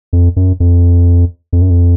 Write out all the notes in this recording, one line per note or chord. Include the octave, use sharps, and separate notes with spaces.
F2
F#2
F2
F2
F#2
F2